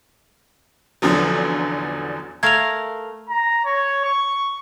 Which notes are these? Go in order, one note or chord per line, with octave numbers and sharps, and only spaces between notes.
A1 E2 D3 F3 F#3
A3 A#4 F5 G#6 F7
A#5
C#5
C#6